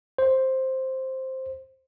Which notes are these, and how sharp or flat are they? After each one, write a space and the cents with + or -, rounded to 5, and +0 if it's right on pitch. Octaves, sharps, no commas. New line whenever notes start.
C5 +5